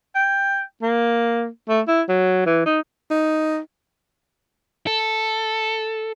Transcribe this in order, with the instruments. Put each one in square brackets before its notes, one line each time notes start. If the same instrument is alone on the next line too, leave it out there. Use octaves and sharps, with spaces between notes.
[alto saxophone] G5
A#3
A3
E4
F#3
E3
D#4
[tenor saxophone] D#4
[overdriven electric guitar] A4